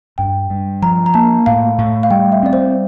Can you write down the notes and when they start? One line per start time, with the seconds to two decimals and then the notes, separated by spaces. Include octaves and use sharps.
0.18 G2 G5
0.50 G2
0.82 F3 A#5
1.06 A#5
1.14 A#3 A5
1.46 A2 F5
1.78 A2
2.03 F5
2.10 G3 G5
2.32 E5
2.43 C4 D5
2.53 C5